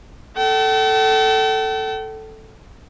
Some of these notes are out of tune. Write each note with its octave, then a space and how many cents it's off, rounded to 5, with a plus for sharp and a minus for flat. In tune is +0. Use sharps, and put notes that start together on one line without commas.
A4 +0 G5 -45